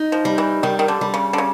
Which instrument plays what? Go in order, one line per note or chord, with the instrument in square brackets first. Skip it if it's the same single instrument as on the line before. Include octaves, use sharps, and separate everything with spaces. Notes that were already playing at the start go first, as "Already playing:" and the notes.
Already playing: [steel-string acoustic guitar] D#4
[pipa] F3
[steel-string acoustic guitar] G3
[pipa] E3
[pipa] D#3 [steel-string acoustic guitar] G3
[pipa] D#3
D3
[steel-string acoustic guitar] G3
[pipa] C#3
D3
C#3